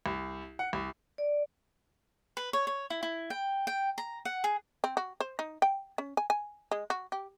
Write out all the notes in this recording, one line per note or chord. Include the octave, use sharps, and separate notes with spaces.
C2
F#5
C2
D5
B4
C#5
C#5
E4
E4
G5
G5
A#5
F#5
G#4
C4
F#4
C5
D#4
G5
C#4
G#5
G#5
G#3
F#4
G4